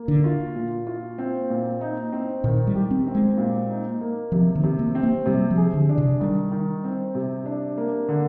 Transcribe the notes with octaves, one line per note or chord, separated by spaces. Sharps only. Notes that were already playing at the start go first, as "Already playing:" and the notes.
Already playing: A#3
D3
F4
A#2
F4
C4
A#2
D#4
C4
A#2 D#3
G3
G4
C4
C4
G#3
A#2
D#4
A#3
C3 F3
D#3
C3
A#3
C4
A#3
C3 G3
F3
G#4
D3
D4
C3
D#3 G3
D#3
C4
C3
D4
A#3
D3